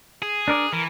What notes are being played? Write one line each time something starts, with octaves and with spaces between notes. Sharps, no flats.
G#4
D4 A#4 D5
E3 A#4